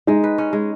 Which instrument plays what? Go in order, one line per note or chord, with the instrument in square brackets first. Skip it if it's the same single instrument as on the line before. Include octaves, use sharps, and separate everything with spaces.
[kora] G#3 [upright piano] D#4
[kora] B4
C#4
G#3